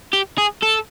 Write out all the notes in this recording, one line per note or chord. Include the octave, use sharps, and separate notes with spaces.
G4
G#4
A4